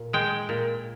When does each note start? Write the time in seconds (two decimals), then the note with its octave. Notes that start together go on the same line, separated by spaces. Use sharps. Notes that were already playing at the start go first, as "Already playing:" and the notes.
Already playing: A#2
0.13 G#3 G5
0.49 A#2